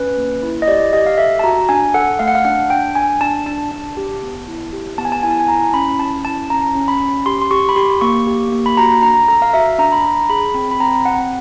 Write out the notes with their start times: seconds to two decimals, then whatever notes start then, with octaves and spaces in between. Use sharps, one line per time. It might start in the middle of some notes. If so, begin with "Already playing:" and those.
Already playing: C#4 B4
0.17 A#3
0.43 E4
0.62 D#5
0.68 G4 D5
0.93 G4 D#5
1.06 F5
1.18 A4 E5
1.39 A5
1.44 F#4 A#5
1.69 D4 G#5
1.94 A4 F#5
2.19 A3 F5
2.28 F#5
2.35 F5
2.45 D4 F#5
2.70 D4 G5
2.95 D4 G#5
3.21 D4 A5
3.46 D4 A5
3.71 D4
3.97 G4
4.22 B3
4.47 E4
4.73 G4
4.98 B3 A5
5.05 G#5
5.12 A5
5.23 E4 G#5
5.31 A5
5.40 G#5
5.48 E4 A#5
5.74 C#4 B5
5.99 C#4 A5
6.25 E4 A5
6.50 C#4 A#5
6.75 C#4
6.88 B5
7.00 C#4
7.26 G4 C6
7.42 C6
7.51 G4 C#6
7.69 B5
7.76 G4 C6
8.01 A#3 C#6
8.27 G4
8.52 A#3
8.66 B5
8.77 F#4 A#5
9.03 D4 A#5
9.28 A4 A#5
9.42 F5
9.54 F#4 E5
9.79 D4 A#5
9.92 B5
10.04 D4 A#5
10.30 G#4 B5
10.54 C4 B5
10.71 B5
10.80 C4 A#5
11.05 C4 F#5